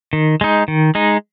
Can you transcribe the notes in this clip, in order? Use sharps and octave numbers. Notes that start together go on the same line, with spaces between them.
D#3
G#3 D#4
D#3
G#3 D#4